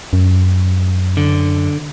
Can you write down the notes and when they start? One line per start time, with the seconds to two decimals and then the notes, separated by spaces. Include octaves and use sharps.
0.13 F#2
1.17 D3